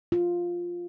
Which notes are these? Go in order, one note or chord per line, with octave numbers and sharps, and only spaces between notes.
F4